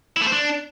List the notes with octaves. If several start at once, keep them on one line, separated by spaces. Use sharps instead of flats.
E4
A3
C5
D4